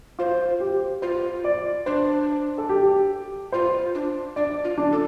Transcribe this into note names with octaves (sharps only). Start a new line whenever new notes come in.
F4 C5
G4
F4 C5
D5
D4 C5
A4
G4
F4 C5
D4
D4 D5
F4
D4
A4